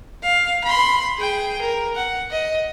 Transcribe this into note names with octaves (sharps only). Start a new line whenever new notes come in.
F5
B5 C6
G#4 G5
A#4
F#5
D#5